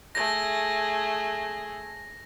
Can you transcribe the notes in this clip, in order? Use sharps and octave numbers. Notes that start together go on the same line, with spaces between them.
A3 G#4 A#6